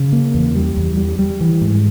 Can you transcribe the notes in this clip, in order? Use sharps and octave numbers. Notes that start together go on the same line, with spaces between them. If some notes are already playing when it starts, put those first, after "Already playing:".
Already playing: C#3
A#3
E2
G3
E2
G3
G3
E3
G#2